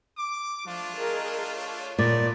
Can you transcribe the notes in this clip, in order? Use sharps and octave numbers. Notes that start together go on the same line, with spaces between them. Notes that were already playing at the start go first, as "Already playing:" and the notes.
D6
F3 A3 D4 F4
G#4 A#4 D#5
C#5
A#2 A3 B3 D#4 D5